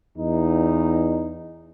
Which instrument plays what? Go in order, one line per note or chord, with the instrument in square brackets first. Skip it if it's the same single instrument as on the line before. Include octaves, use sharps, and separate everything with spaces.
[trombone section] E2 D#4